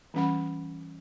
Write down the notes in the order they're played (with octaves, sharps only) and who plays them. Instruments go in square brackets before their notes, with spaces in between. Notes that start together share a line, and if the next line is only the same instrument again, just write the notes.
[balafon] E3 G3 C#4 F#5 B5